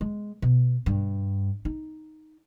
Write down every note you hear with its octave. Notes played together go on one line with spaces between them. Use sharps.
G#3
B2
G2
D#4